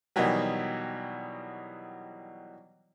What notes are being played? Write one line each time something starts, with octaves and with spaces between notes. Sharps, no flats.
B2 D#3 E3 F#3 G3